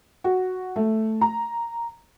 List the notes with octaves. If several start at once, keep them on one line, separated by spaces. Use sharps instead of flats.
F#4
A3
A#5